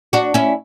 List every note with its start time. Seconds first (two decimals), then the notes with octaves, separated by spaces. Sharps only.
0.13 D4 F#4
0.34 C#4 E4